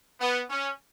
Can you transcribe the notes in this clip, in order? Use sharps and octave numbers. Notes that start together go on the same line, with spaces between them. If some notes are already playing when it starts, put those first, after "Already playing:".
B3
C#4